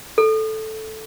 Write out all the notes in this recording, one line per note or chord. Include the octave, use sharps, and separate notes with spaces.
A4